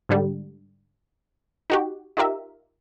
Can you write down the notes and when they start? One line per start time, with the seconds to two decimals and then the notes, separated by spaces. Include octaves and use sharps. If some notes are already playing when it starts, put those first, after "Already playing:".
0.09 G#2 D3 G3
1.70 D#4 F#4 G4
2.17 D#4 F4 G4 A#4 E5